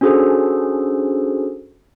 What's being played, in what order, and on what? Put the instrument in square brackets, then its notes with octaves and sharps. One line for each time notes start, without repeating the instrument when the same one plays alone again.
[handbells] C#4 D4 F#4 G#4 A4 C5